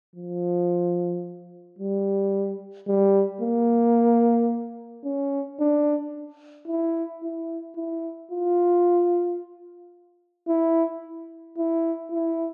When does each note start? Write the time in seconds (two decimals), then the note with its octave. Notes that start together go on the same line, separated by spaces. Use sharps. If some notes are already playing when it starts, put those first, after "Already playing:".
0.16 F3
1.79 G3
2.88 G3
3.41 A#3
5.05 C#4
5.60 D4
6.68 E4
7.23 E4
7.76 E4
8.32 F4
10.48 E4
11.58 E4
12.12 E4